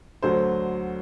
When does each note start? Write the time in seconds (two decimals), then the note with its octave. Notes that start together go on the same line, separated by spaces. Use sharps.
0.22 D2 D3 F#3 C5